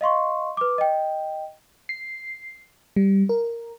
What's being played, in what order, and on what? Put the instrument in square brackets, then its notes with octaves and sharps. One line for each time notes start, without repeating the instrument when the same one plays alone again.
[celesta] D#5 F5 C6 C#6
B4 D6
D#5 G5
[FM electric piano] C7
G3
A#4